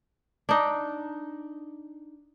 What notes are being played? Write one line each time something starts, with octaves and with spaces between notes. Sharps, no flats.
D4 D#4